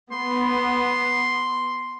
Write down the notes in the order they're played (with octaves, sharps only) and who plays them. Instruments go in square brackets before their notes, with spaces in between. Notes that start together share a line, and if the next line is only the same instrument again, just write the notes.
[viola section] B3 [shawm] C6